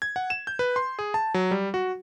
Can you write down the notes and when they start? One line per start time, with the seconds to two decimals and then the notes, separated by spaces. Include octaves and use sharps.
0.02 G#6
0.16 F#5
0.30 E7
0.47 G6
0.59 B4
0.76 C6
0.99 G#4
1.14 A5
1.34 F#3
1.51 G3
1.74 F#4